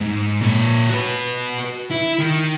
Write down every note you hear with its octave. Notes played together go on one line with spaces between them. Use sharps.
G#2
A#2 C#5
F#4 B4
E4
D#3